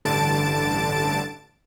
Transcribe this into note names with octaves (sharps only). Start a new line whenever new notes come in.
A1 G2 D3 A5 A6 D7